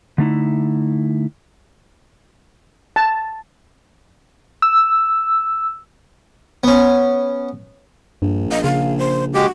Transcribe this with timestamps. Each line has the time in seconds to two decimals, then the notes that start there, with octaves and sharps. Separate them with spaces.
0.18 D3 A3 D#4 E4
2.96 A5
4.62 E6
6.64 B3 C#4
8.22 A#1 G2
8.52 A#3 D#5
8.64 C#3 F5
8.98 C5
9.35 G#3 F#4 G4